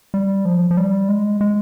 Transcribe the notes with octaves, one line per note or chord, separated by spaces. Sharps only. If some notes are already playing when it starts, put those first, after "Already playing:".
G3
F3
F3
G3
G#3
G#3